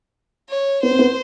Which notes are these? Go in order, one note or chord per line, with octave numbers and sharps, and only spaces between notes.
C#5
B3 C5
C4
B3